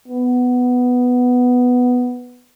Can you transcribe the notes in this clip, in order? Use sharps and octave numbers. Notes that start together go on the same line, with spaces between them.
B3